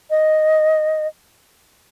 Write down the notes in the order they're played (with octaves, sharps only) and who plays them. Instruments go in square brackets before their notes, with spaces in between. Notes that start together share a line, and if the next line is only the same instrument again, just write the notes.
[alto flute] D#5